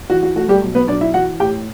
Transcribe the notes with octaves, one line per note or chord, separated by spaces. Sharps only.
E3 F#4
F#4
A3 F#4
G3 G4
B1
B3 B4
B1 D4 D5
E4 E5
E3 F#4 F#5
A2 G4 G5